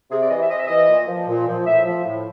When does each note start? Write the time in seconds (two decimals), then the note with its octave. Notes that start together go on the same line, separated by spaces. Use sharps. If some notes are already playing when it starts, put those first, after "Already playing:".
0.11 C3 G#4
0.20 D5
0.30 E3 D#5
0.40 E5
0.49 C3 D#5
0.59 E5
0.67 E3 D#5
0.89 A#2
1.07 F3
1.28 A#2
1.47 F3
1.66 A2 E5
1.85 F3
2.05 A2